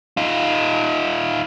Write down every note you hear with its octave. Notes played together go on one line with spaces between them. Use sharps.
D#4 F4